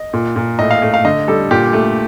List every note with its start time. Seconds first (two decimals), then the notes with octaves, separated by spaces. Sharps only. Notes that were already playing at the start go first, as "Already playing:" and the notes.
Already playing: D#5
0.13 A#2
0.36 A#2
0.59 A2 D#5
0.71 F5
0.82 A3
0.94 F5
1.05 D3 D#5
1.28 G3 A4
1.51 A#2 G4
1.73 A3